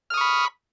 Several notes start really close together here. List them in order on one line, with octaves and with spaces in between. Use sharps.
F6 D#6 C#6 B5